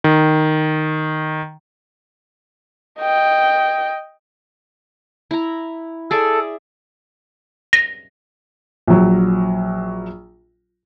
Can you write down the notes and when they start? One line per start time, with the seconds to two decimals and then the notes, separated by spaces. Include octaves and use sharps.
0.04 D#3
2.99 D#5 G5
5.31 E4 A#5
6.11 G#4 A4 D5 E5
7.73 A#6
8.87 A#1 F#3